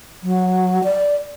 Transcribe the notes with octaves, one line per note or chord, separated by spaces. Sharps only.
F#3
D5